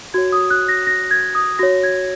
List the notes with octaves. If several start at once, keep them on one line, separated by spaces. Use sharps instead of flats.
F#4 C#5 G#6
D#6
F#6
A#6
A#6
G#6
D#6
F#4 C#5 A#6
G#6